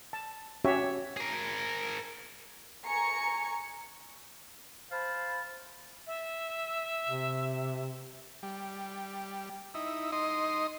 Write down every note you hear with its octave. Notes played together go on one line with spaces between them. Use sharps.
A5
C#4 F#4 G4 C#5 E5
G#4 A#4
G#5 A#5 C#6 C#7
C5 F5 A5 B5
E5
C3
G3
D#4 E4
D#4 D#5 C6